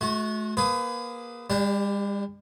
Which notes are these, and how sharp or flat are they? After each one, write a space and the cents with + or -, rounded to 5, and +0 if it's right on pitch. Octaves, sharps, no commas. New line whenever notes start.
A3 -40 F#4 -15
A#3 +25 G#4 +0 B4 +30
G3 +45 D4 +0 G4 +0